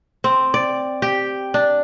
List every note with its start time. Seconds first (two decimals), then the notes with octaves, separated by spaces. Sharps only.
0.24 C4
0.54 D5
1.02 G4
1.54 D4